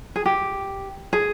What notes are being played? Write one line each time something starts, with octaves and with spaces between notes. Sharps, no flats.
G#4
G4
G#4